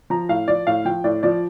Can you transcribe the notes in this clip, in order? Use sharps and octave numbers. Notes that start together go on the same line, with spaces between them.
F3 A#5
A2 F5
F3 D5
A2 F5
F3 G5
A2 D5
F3 D5